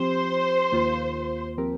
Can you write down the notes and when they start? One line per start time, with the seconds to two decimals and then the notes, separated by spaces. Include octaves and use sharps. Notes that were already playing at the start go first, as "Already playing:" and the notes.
Already playing: F3 C4 G4 C5
0.72 D#2 D#3 A#3 F4
1.58 F3 C4 G4 A#4